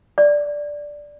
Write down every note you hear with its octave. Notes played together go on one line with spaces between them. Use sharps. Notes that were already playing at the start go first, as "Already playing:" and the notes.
D5